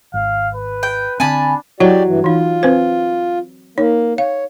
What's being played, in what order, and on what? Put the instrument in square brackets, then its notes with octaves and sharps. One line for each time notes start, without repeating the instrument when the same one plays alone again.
[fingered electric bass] G#1 [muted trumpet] F5
[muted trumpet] B4
[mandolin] G5
[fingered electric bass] D3 C4 [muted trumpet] D4 [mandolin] G#5 A5 B5
[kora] F#3 [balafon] E4 D#5 [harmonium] F#4 G4 D5
[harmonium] G2 E3
[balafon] E3 D#4 [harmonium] F4
[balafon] C4 B4 C5
[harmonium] A#3 [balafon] D#4 C#5
[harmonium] C#5 [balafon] F5